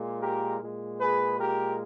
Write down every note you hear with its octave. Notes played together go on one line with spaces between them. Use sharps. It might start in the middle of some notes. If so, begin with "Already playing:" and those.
Already playing: A#2 G#3
G4 A#4
A#2 G#3
G#4 B4
G4 A#4